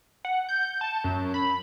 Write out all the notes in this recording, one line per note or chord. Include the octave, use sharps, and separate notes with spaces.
F#5
G6
A5
F#2
B5